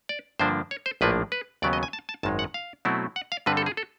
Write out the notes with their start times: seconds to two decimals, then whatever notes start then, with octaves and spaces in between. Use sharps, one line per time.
0.09 D5
0.39 G2 D3 F3 A#3 D4 C5
0.71 C#5
0.86 C5
1.01 A#1 A2 F3 A#3 D4 B4
1.32 B4
1.62 D#2 C#3 F#3 B3 D5
1.73 D#5
1.83 G#5
1.93 A5
2.09 A5
2.23 G#1 F#2 D#3 G#3 A5
2.39 F#5
2.54 F5
2.85 B2 F#3 A3 C4 E4
3.16 F#5
3.32 F5
3.46 G2 D3 G3 C4 B4
3.57 A4
3.66 G#4
3.77 A4